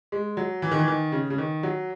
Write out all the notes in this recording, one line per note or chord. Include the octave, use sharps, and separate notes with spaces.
G#3
F#3
E3
D#3
E3
D#3
C#3
C#3
D#3
F#3